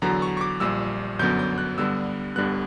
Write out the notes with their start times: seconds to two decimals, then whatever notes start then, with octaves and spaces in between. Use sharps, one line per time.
0.02 E2 D3 F#3 B3 A#5
0.22 C#6
0.37 C#6
0.41 D6
0.60 A#1 A#2 G3 E6
1.19 G1 F#2 D3 F#3 B3 G6
1.39 G6
1.58 F#6
1.78 G2 D3 G3 B3 E6
2.36 G1 G2 D3 G3 B3 F#6